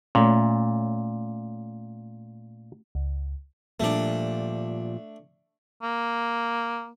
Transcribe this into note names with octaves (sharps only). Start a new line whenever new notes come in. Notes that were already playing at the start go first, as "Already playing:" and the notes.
A#2 A3 C#4
C#2
A#2 F3 G3 A3 D4
A#3